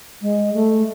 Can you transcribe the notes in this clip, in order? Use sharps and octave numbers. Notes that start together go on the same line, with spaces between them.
G#3
A3